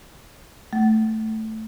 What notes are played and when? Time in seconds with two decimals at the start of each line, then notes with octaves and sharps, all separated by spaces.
0.73 A3